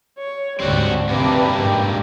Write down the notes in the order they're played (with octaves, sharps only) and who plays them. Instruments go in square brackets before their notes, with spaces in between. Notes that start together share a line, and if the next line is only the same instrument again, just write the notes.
[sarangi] C#5
[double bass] D2 G#2 [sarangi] G3 [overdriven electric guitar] C4 F#4
[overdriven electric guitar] G2 A#3 [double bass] C3 D4 [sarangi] B4
[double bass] G#2 [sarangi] G4